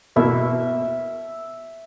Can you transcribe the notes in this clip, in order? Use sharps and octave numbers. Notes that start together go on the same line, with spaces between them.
B2 A#3 E4 E5